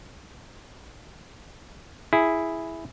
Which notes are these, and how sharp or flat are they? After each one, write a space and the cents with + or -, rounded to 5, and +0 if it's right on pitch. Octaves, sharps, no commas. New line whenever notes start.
E4 +0 G#4 +0